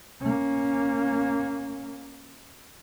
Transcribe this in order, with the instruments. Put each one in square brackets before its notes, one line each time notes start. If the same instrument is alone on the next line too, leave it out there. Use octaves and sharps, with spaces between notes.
[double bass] A#3 C#4